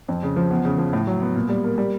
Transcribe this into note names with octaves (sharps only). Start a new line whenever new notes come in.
F2
C#3
F3
E2
C#3
F3
A2
F#3
B3
A#2
G3
A#3
G3